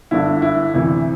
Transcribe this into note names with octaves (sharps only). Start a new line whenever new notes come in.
G1 G2 D3 E4
E4
D2 C3 E3 E4